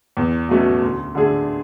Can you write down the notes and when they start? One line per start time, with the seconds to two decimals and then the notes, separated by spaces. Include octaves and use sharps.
0.17 E2
0.49 B2 F#3 A3 C#4
0.82 D2
1.15 D3 A3 D4 G#4